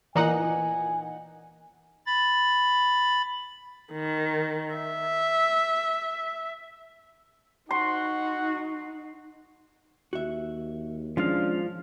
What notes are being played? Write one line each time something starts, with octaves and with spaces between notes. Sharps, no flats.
A#2 E3 D#4 F#5 G#5
B5 A6
D#3
E5
D#4 F#4 C6
D#2 F#4 E5
A#2 F3 G#3 C#4 D4 F4 F5